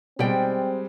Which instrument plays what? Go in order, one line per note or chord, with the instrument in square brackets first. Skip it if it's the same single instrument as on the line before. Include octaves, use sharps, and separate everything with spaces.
[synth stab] B2 [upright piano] G3 G#3 [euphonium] C4 [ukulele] D5 G5